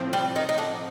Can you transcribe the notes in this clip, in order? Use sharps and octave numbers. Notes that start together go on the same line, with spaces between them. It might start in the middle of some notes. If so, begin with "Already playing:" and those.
Already playing: A2 F3 C4
G3
D#3 D#4
D#4
D3 D4